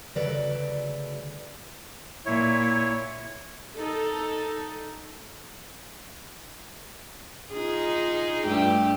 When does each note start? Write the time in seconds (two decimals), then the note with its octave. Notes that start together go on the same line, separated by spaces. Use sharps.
0.15 D2 C#3 F#3 A4 B4 D5
2.26 A#2 E4 C#5
3.77 D#4 A4
7.53 D#4 F4 G#4
8.47 G2 A3 G4